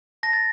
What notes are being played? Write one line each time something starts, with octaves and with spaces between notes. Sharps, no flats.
A5 A#6
A6